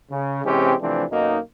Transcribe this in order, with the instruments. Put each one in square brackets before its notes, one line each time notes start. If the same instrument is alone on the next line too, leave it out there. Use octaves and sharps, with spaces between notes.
[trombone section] C#3
C3 E3 G#3 C4 C#4 G4
C3 E3 F3 A3 C4 D4
B1 F#2 A#3 D#4